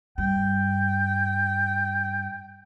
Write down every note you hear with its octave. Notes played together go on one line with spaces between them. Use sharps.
G2 G5